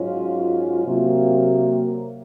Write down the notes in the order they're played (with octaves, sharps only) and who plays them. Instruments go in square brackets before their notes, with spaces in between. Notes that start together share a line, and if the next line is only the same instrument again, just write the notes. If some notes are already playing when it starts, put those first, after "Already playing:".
Already playing: [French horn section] G#2 F#3 C#4 F4
C3 F#3 A#3